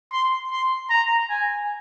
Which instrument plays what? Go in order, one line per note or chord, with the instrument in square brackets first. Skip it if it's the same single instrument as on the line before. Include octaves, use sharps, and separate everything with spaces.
[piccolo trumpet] C6
C6
A#5
G#5